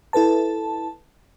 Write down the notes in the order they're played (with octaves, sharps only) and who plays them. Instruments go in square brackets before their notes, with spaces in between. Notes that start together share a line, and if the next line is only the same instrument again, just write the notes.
[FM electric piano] E4 A4 B4 A5